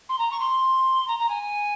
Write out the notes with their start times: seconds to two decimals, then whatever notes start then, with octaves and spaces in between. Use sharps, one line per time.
0.09 C6
0.18 A#5
0.31 C#6
0.40 C6
1.08 A#5
1.19 A#5
1.29 G#5